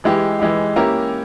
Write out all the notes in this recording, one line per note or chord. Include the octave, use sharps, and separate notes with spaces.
E3 G#3 E4 G4
E3 G#3 E4 G4
A#3 C#4 E4 G4 A#4